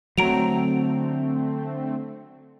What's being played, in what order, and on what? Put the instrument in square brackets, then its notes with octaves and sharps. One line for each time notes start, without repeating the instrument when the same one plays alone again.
[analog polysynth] D3 A3 C4 [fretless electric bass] F#3 [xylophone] A#5 D7 F7